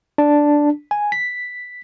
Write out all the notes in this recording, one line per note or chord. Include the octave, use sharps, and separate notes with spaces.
D4
G#5
B6